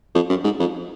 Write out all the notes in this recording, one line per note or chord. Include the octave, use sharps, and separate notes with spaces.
F2
F#2
G#2
F2